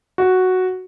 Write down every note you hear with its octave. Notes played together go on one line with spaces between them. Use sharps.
F#4